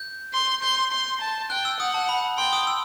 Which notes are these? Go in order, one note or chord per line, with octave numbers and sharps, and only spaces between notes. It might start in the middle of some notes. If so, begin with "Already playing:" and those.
Already playing: G6
C6
C6 G6
C6
A5
G5 F#6
E6
F#5 D#6
A5
B5
G5 C6
D#6
E6